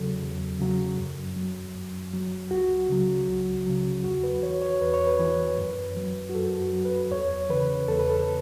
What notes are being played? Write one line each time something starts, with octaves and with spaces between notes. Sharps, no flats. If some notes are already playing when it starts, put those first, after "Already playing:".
Already playing: E2 C#3 F#3 A4
E2
C#3 F#3
F#2
F#3
F#2
F#3
C#2 F#4
C#3 F#3
C#2
C#3 F#3
E2 F#4
B4
E3 C#5
C#5
E2 B4
C#5
B4
E3
F#2
F#3
F#4
F#2 A4
F#4
F#3
B4
E2 C#5
C#3 E3 B4
E2 A4
B4
A4